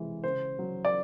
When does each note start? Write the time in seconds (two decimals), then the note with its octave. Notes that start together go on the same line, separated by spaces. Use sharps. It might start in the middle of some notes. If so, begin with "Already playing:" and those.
Already playing: C3 E3 G#3
0.24 C#3 C5
0.59 F#3
0.85 D5